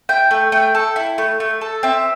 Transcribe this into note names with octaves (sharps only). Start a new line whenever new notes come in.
E4 G5
A3
A3 G5
A4
E4
A3
A3
A4
C4 E5